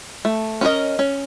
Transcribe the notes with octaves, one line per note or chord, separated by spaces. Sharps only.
A3
C#4 F4 A#4 D#5
C#4